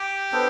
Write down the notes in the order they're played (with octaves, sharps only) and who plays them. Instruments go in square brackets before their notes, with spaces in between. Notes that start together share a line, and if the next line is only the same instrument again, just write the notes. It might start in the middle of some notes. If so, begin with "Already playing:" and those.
Already playing: [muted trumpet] G4
[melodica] B3 D4 A4 C5